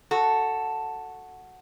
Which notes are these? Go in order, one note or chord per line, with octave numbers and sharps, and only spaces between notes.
F#4 A4